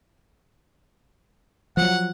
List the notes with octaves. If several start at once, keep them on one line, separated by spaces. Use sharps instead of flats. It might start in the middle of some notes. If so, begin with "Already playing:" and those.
F3 F#3 F#5